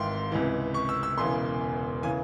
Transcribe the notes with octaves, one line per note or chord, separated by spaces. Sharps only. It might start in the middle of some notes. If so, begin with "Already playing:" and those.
Already playing: G#1 G#2 E3 E5 F5 G5 C6
C#2 C3 E3
C#6
E6
E6
E1 E2 C#3 E3 C6
C#3 E3 G#5